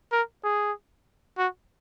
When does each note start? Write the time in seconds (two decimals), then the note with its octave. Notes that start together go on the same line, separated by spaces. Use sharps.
0.12 A#4
0.44 G#4
1.38 F#4